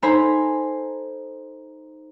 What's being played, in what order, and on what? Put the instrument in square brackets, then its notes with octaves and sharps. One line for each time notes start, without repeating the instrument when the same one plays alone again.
[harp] D#4 A4 C5 G#5 A#5 B5